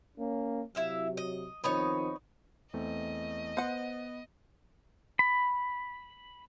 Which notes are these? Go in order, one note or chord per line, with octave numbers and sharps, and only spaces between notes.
A#3 C#4
C3 F#3 E4 E5 F5
D#5
D#3 F3 B3 C4 D#4 C#5
E2 A3 C4 D#5
B3 C5 F#5
B5